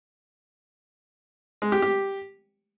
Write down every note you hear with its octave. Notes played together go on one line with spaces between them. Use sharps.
G#3
G4
G4